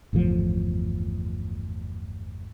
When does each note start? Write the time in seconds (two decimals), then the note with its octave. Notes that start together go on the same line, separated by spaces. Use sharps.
0.13 G1 E2 A2 F3